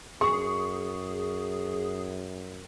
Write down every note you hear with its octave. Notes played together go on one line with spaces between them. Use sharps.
F#2 G#4 C#6